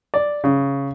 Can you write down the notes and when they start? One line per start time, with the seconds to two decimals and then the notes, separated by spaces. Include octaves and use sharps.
0.14 D5
0.44 C#3